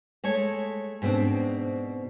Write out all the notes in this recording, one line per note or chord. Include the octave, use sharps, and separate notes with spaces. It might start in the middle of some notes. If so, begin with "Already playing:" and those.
G#3 A3 C#5
G#2 B2 A#3 C4 D4